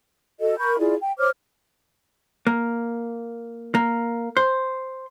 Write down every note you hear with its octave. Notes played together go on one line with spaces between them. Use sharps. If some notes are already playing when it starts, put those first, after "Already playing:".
F#4 A4 D#5
A#4 B5 C#6 G6
E4 F4 G#4 D5
G5
C5 C#5 D6 F6
A#3
A#3
C5